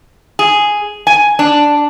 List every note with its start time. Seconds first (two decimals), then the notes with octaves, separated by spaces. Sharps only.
0.39 G#4
1.07 G#5
1.39 D4